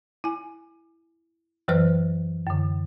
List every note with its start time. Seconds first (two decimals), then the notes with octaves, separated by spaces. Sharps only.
0.24 E4 G#5
1.68 F#2 E3 F#3 B4 C5 F6
2.47 F#2 D3